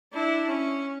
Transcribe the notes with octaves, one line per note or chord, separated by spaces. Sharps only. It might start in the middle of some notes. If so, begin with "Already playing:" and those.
D4 E4
C#4